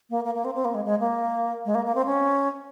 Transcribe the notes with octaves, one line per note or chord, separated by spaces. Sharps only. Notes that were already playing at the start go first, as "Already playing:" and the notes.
A#3
A#3
A#3
C4
C4
A#3
G#3
G#3
A#3
G#3
A#3
A#3
C4
C#4